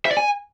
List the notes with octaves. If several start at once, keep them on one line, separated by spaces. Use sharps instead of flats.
E5
D5
G#5